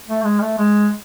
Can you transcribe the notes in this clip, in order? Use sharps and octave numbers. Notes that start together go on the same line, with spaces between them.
A3
G#3
A3
G#3